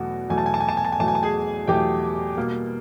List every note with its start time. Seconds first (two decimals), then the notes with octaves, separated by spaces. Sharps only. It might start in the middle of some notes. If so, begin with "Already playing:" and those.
Already playing: E2 B2 F#3 A3 F#4
0.30 E2 B2 F#3 A3 G#5
0.38 A5
0.46 G#5
0.54 A5
0.60 G#5
0.69 A5
0.77 G#5
0.85 A5
0.92 G#5
0.99 E2 B2 F#3 A3 A5
1.08 G#5
1.15 A5
1.23 G#4 G#5
1.68 E2 B2 F#3 A3 G4 G5
2.37 B2 G3 A#3